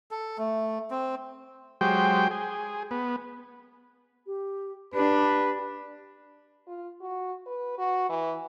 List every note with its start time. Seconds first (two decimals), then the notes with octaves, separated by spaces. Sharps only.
0.11 A4
0.38 A3
0.91 C4
1.81 F#3 G#3 G4 C5 G5
2.31 G#4
2.91 B3
4.26 G4
4.94 D4 G4 B4
6.67 F4
7.01 F#4
7.46 B4
7.78 F#4
8.09 E3